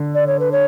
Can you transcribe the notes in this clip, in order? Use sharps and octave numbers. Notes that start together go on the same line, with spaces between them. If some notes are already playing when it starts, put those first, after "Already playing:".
Already playing: D3
D5
C#5
B4
C#5